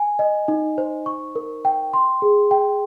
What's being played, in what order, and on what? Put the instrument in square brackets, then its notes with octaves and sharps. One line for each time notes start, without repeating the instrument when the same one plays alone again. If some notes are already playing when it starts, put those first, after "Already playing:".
Already playing: [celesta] G#5
D#5
D#4
C5
C#6
A#4
G5
C6
G#4
G5